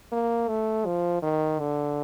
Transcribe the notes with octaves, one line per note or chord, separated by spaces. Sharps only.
A#3
A3
F3
D#3
D3